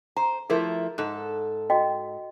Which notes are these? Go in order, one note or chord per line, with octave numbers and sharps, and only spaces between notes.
C5 A#5
F3 A3 E4 G#4 A#4
G#2 A4
F#4 D#5 G5